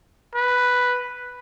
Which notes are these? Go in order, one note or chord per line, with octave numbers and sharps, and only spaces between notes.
B4